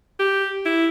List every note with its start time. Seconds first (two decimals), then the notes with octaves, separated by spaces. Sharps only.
0.20 G4
0.66 E4